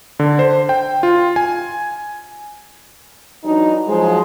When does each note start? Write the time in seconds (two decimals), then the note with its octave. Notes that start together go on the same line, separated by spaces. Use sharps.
0.19 D3
0.39 C5
0.69 G5
1.03 F4
1.36 G#5
3.44 E3 F#3 D4 D#4
3.87 F3 F#3 G#3